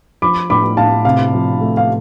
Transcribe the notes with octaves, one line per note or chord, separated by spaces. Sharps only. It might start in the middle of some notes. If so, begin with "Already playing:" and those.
F3 B5 D6
A2 B5 D6
A2 F5 A5
C3 F5
F3
A3
F5